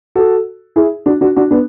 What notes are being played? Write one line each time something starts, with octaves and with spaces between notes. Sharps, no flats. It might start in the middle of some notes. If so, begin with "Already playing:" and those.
F#4 A4
E4 G#4
D4 F#4
D4 F#4
D4 F#4
B3 D4